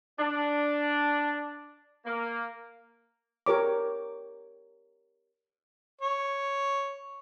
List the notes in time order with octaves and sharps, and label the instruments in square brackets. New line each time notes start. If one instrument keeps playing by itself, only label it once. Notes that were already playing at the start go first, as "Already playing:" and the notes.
[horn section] D4
A#3
[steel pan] G4 A#4 C#5 D6
[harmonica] C#5